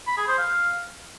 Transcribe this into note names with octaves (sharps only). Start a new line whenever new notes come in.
B5
G#4
C5
F5